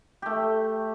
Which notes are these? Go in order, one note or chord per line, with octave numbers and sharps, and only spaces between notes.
A3 G4